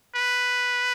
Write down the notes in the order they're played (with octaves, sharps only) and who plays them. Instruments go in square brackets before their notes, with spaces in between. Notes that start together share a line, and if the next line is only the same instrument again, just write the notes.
[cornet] B4